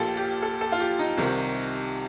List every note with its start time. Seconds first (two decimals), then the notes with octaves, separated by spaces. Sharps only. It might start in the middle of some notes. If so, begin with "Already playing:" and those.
Already playing: A#1 A#2 F4 G4 A4
0.17 G4
0.42 A4
0.61 A4
0.72 F4
0.80 G4
0.99 D#4
1.18 C2 C3 D#3